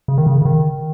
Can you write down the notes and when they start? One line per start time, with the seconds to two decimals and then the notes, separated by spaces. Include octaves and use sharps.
0.08 C#3
0.18 D#3
0.26 C#3
0.42 C#3
0.45 D#3